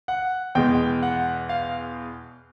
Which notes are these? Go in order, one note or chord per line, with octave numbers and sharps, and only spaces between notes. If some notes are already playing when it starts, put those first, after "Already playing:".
F#5
E2 B2 G#3 G5
F#5
F5